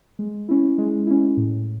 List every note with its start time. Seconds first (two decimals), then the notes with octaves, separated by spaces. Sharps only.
0.19 G#3
0.49 C#4 E4
0.78 G#3
1.07 C#4 E4
1.37 A2